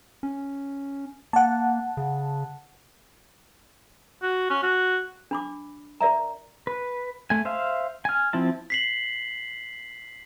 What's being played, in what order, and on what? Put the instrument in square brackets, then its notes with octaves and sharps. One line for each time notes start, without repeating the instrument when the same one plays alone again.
[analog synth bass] C#4
[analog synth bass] A#3 [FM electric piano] F#5 A5
[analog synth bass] C#3
[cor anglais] F#4
C#4
F#4
[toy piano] D4 B5 D6
A#4 D5 E5 A#5
[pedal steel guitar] B4
A3 G#5
C5 E5 F5
G#5 F6
F3 C4 E4 A5
[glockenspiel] B6 C7 F#7